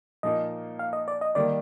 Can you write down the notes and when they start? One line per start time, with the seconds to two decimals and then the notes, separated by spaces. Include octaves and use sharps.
0.23 A#2 F3 A#3 D#4 D#5
0.79 F5
0.93 D#5
1.08 D5
1.21 D#5
1.35 D#3 G3 A#3 D5